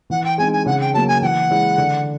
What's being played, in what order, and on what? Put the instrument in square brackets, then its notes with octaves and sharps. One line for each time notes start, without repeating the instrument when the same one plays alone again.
[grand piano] E3 [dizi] F#5
[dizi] G5
[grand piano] G#3 C4 D#4 [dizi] G#5
[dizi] G#5
[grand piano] C#3 [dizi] F#5
[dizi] G5
[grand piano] F#3 A#3 [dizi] A5
[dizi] G#5
[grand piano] E3 [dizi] F#5 G5
[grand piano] G#3 C#4 E4
D3